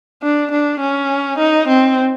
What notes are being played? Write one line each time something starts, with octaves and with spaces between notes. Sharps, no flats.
D4
D4
C#4
D#4
C4